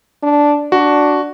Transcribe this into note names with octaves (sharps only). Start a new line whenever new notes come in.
D4
D4 F#4